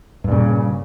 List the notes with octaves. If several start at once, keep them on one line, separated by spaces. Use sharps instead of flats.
G2 A#2 C#3